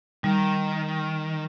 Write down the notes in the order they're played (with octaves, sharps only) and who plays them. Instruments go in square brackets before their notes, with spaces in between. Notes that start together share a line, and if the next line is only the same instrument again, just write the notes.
[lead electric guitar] D#3 [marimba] G3